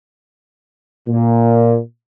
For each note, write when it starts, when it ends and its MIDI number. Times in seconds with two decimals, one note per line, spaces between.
1.09 1.78 46